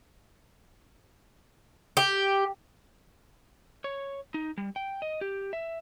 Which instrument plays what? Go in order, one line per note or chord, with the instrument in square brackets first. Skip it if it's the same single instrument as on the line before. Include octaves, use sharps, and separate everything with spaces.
[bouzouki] G4
[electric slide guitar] C#5
D#4
G3
G5
D#5
G4
E5